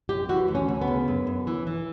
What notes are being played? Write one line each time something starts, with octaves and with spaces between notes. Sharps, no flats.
F#2 G4
E3 F#4
D2
C#4
D2
B3
C#3
F#2
F#2
E3
E3